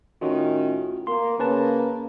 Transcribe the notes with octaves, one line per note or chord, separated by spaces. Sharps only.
A2 D#3 C#4 F4 F#4
A#3 C6
C#3 A#3 C#4 B4 A5